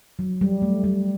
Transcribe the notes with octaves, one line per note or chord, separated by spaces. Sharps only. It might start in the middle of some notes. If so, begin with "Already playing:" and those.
F#3
G3
A3
G3